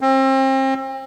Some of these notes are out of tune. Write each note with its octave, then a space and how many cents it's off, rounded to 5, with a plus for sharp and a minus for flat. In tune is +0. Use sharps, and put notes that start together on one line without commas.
C4 +35